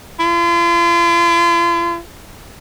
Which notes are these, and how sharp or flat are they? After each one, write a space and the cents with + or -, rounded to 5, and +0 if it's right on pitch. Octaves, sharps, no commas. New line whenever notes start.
F4 -40